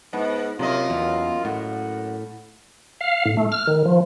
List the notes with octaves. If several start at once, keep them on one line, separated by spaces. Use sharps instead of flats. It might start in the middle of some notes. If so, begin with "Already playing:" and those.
G#2 B3
F#2 C3 A#3 F4 D#5
E2
A2 F#5
F5
A2
A3
F6
D#3
F3